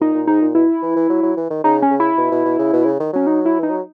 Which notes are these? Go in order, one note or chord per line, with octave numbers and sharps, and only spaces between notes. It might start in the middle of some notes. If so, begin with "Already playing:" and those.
A#2 D#4
A#2
G#2 D#4
A#2
B2 E4
E3
E3
F#3
F#3
E3
D#3
C#3 D#4
C#4
C#3
E4
B2
B2
B2
C#3
B2
C#3
D#3
F#3 C#4
D#4
E4
E3 D#4
F#3